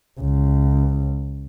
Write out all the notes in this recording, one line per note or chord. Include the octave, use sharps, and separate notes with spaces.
C#2